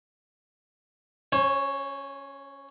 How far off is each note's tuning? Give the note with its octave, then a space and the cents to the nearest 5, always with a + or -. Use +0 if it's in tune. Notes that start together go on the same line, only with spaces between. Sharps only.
C#4 +0 C5 +45